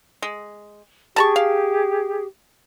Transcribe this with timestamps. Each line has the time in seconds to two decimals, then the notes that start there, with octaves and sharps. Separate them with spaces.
0.22 G#3
1.16 G4 G#4 A5 A#5 C#6
1.36 F5